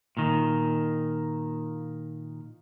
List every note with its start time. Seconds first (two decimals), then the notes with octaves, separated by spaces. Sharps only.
0.17 A#2 D#3